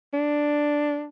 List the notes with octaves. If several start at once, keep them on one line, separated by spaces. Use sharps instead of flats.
D4